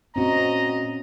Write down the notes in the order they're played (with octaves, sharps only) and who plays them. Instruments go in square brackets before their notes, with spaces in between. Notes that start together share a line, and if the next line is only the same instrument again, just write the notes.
[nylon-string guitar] A#2 F#4 [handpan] C4 C#4 [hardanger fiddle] D#5 [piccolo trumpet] A#5